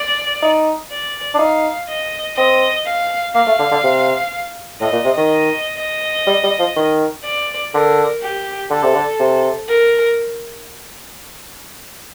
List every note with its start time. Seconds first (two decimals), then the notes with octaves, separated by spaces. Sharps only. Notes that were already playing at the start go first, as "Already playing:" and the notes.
Already playing: D5
0.42 D#4
0.91 D5
1.34 D4
1.39 D#4 F5
1.89 D#5
2.36 C4 D#5
2.86 F5
3.35 A#3 F5
3.47 A3
3.59 D3
3.71 D3
3.84 C3
4.81 A2 D#5
4.93 A#2
5.05 C3
5.18 D#3
5.29 D#5
5.78 D#5
6.27 G3
6.43 G3
6.59 F3
6.76 D#3
7.24 D5
7.73 D3 A#4
8.22 G4
8.70 D3 A4
8.83 C3
8.95 D3
9.19 C3
9.68 A#4